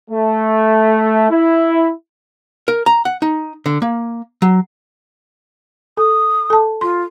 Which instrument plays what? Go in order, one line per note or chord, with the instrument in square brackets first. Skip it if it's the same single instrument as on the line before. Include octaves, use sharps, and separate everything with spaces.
[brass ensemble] A3
E4
[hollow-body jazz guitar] A#4
A#5
F#5
D#4
D3
A#3
F#3
[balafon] A4 [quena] D#6
[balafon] A4 A5
[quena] F4 [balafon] C6